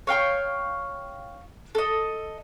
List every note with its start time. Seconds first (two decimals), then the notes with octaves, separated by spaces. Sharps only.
0.07 C#5 F5 G5 C#6
1.75 A4 D#5